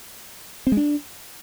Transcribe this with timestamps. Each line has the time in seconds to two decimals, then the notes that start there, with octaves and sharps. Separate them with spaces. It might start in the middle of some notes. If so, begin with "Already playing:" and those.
0.67 C4
0.72 G#3
0.77 D4